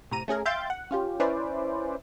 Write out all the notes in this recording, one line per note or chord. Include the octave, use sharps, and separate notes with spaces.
A2 C3 A#5 D#7
A3 C#4 G#4 A#4
E5 F5 G5 C6 G6 A6
F#5
C#4 F4 G4
C#4 E4 B4 C5 D5